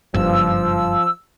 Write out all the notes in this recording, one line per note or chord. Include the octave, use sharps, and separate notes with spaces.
F#1 G2 F3 E6